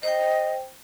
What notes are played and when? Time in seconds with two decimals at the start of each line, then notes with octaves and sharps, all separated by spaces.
0.03 C5 D#5 G5